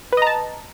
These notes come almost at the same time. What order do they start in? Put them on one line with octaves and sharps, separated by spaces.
B4 D#5 A#5 A5